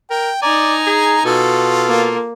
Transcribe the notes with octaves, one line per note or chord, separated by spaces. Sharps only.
A#4 G5
D#4 D5 G#5 A#5
G#4
B2 F4 A4
A#3